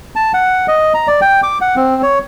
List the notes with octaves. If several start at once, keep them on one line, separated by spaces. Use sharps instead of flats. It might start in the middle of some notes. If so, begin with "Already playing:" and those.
A5
F#5
D#5
A#5
D5
G5
D6
F#5
C4
C#5